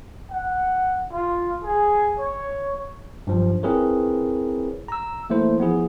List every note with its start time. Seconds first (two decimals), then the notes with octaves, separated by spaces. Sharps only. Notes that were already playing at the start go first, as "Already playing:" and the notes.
0.31 F#5
1.13 F4
1.64 G#4
2.19 C#5
3.27 G2 F3 F#3
3.63 C4 E4 G#4 A#4 B4 C#5
4.88 A#5 E6
5.30 E3 A3 A#3 E4 C5
5.58 F3 B3 E4 G#4